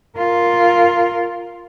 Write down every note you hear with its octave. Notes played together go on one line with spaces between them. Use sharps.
F4 A#4